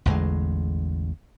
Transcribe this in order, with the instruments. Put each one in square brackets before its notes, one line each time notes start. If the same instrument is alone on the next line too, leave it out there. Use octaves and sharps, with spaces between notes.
[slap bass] A1 E2 D3 G#3